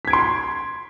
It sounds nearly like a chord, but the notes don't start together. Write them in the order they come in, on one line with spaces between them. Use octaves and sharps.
B6 G#6 D7 C6